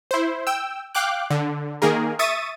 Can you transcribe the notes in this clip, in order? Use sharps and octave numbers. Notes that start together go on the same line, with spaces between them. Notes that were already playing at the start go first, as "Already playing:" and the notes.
E4 C5
G5 E6
F5 G5 D6 F#6
D3
D#3 A#3 G#4 A#4
E5 C#6 D#6 A6 D#7